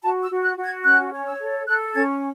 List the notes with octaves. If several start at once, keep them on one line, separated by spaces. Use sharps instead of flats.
F#4 A5
E6
F#4
F#6
F#4
G#6
C#4 F#6
C#5
E6
A4
A4 F#6
C#4 G#6